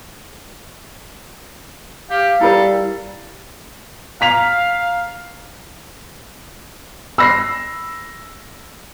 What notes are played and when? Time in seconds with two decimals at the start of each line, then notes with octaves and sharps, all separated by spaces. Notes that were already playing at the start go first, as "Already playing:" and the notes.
2.10 G4 F5
2.41 G3 E4 F4 A4 A#4
4.21 F5 A#5 B6 F7
7.18 B5 E6 A#6 C7